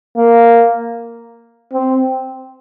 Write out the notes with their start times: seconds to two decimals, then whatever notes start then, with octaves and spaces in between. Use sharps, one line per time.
0.17 A#3
1.73 C4